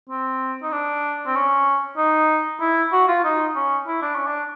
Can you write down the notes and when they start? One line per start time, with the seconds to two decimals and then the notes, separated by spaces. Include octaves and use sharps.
0.09 C4
0.62 D#4
0.72 D4
1.26 C4
1.35 C#4
1.97 D#4
2.61 E4
2.92 F#4
3.08 F4
3.24 D#4
3.56 C#4
3.87 E4
4.02 D4
4.15 C#4
4.27 D4